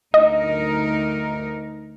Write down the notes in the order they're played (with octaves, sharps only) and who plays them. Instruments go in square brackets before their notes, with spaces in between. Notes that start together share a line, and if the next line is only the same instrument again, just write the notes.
[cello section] D2 D#4 A#4 [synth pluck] D#5